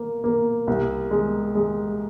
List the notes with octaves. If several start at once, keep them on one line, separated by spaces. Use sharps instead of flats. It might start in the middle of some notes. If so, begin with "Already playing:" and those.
Already playing: A#3
A#3
C2
G#3
G#3